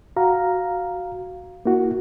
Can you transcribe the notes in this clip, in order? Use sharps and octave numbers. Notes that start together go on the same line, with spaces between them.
F#4 F5 A#5
A#3 E4 F#4